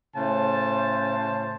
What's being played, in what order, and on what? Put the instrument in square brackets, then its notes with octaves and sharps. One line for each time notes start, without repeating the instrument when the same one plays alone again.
[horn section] A2 C#3 C5 A5